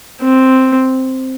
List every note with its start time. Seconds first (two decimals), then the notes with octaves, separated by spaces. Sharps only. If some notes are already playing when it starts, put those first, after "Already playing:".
0.21 C4